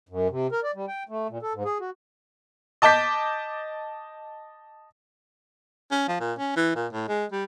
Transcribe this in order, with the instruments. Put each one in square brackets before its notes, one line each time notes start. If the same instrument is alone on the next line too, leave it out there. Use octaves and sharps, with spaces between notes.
[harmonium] F#2
C3
A#4
D5
G3
G5
A3
A#2
A4
G#2
G#4
F#4
[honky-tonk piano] D#5 A5 D6 G6 B6
[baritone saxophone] C#4
F3
A#2
C#4
E3
A#2
A2
G#3
G3